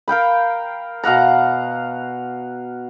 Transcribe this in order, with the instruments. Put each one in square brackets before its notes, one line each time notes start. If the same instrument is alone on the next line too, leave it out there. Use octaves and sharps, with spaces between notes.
[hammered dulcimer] A#4 F5 G5 B5
B2 F5 F#5 A#5